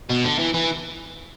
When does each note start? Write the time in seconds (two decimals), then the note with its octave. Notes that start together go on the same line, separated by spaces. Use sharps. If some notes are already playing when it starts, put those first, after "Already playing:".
0.10 B2
0.25 D3
0.39 E3
0.54 E3